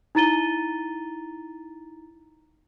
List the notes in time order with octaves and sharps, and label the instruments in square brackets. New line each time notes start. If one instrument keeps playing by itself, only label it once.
[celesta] D#4 E4 A#5 A6 D#7 G7